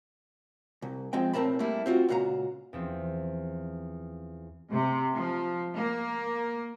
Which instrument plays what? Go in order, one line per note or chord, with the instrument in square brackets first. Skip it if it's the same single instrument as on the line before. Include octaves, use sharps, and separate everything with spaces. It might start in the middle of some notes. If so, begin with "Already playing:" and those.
[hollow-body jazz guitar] C2
F3 G#3 C4 G5
B1 A2 C4 A#4 A5 B5
G3 A3 A#3 E4
C4 F4 F#4
C#2 A#2 F#4 F5 A#5
[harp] E2 F3 C4
[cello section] C3
F3
A#3